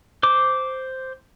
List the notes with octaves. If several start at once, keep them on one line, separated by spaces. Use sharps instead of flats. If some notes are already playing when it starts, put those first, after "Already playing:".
C5 D6